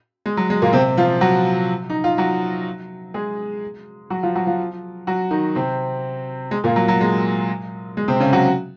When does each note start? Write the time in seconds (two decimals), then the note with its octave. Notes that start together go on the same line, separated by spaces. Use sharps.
0.26 G#3
0.37 F#3
0.50 G#3
0.62 A#2 A#3
0.73 C3 C4
0.97 F3 F4
1.21 F#3 F#4
1.90 D#4
2.04 F4
2.18 F#3 F#4
3.14 G#3 G#4
4.10 F#3 F#4
4.23 F3 F4
4.36 F#3 F#4
4.47 F3 F4
5.07 F#3 F#4
5.31 D#3 D#4
5.55 C3 C4
6.51 G#3
6.64 A#2 A#3
6.76 F#3
6.88 F#3
7.01 G#3
7.97 G#3
8.08 C3 C4
8.20 C#3 C#4
8.33 F#3 F#4